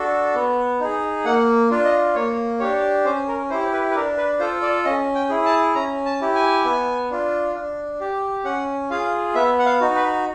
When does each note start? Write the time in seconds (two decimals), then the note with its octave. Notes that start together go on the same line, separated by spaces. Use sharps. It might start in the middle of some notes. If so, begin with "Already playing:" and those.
Already playing: D4 F#4 A4
0.35 B3
0.80 D#4 G#4
1.24 A#3 F#5
1.71 D4 F4
1.85 D#5
2.15 A#3 C#5
2.60 D4 G4 C#5
3.05 C#4 C5
3.28 A#4
3.50 E4 G4 C5
3.73 B4
3.91 B4
3.95 D4 A#4
4.17 B4
4.40 F4 A4 C5
4.62 D5
4.85 C#4 D#5
5.15 G5
5.29 E4 G#4
5.46 A5
5.75 C#4 A#5
6.05 A5
6.21 E4 G4
6.35 G#5
6.65 B3
7.10 D4 F4
7.55 D4
8.01 G4
8.45 C#4 F#5
8.90 F4 G#4 F5
9.35 B3 E5
9.59 F#5
9.66 F5
9.81 D#4 F#4
9.95 B4